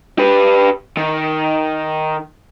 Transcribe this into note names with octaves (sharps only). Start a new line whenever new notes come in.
G4 B4
D#3